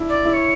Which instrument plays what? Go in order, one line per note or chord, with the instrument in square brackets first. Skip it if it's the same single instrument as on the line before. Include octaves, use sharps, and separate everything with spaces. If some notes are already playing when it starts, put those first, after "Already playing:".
Already playing: [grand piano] D4 E4
[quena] D5
[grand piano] E4
[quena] C#5